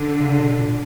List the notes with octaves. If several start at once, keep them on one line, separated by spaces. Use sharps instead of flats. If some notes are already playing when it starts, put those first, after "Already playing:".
Already playing: D3
C#3
B2
A#2